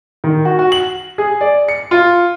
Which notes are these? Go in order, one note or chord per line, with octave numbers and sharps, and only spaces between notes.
D#3
F#4
F#4
F#7
G#4
D5
C#7
F4